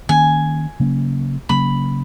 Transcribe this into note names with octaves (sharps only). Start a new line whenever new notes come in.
D#3 A#3 C#4 G#5
C#3 F#3 A#3 C#4
C#3 F#3 A#3 C#4 B5